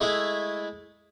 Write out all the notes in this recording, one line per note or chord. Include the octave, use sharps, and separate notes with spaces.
G#3 A3 E4 G#4